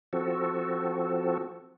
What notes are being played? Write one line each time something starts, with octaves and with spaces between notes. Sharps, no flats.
F3 C4 F#4 A4